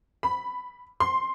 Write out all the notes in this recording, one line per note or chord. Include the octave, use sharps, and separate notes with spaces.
B5
C6